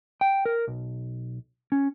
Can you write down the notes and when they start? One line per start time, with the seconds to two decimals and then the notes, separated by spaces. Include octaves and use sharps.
0.21 G5
0.46 A#4
0.68 B1
1.72 C#4